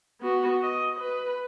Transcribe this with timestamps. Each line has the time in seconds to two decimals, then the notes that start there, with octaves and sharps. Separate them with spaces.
0.22 B3 F#4
0.63 D#5
1.00 B4